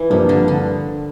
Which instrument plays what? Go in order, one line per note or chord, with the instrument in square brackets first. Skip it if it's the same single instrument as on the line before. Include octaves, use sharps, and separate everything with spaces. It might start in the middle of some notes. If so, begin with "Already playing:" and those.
Already playing: [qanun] E3
[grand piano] G2 F3 A#3 [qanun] C3
[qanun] D3
D3